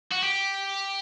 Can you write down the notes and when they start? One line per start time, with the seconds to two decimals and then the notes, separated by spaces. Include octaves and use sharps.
0.11 F#4
0.23 G4